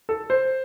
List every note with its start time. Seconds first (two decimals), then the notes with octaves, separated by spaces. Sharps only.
0.09 A4
0.30 C5